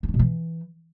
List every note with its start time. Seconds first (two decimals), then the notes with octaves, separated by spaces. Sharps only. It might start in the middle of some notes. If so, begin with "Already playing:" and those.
0.03 C4
0.09 D4
0.14 B2
0.19 E3